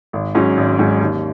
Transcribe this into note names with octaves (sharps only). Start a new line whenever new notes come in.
G#1
G#2 F#3 C#4
G#1
G#2 F#3 C#4
D#2